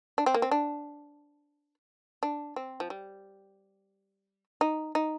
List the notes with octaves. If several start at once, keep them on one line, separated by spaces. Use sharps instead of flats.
D4
C4
A#3
C4
D4
D4
C4
F3
G3
D#4
D#4